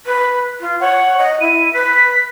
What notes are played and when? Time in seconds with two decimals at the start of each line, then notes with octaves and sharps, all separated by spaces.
0.06 B4
0.61 F4
0.80 C#5 F#5
1.18 D#5
1.40 E4 D#7
1.73 B4 B6